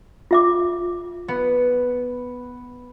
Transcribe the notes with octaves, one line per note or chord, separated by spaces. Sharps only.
F4 E5 D6
B3